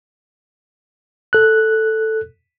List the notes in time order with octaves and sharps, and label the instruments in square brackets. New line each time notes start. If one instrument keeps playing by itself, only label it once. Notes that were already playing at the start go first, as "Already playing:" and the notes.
[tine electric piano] A4 F#6